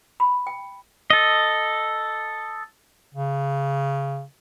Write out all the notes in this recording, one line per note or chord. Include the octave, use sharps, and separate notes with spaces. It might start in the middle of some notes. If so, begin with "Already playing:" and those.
B5
G5
A4 D#5
C#3